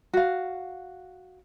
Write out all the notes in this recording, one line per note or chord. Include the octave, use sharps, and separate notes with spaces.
F#4 F5